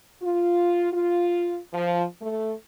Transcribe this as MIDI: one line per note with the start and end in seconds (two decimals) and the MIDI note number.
0.22 0.90 65
0.93 1.57 65
1.73 2.04 53
2.21 2.53 57